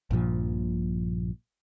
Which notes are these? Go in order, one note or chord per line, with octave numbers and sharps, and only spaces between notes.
A#1 G2 A#2 F3